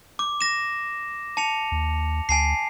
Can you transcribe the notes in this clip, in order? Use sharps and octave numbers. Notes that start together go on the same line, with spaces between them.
D6
A#6 E7
A5 C#7 F7
D#2
D2 G#5 A5 C7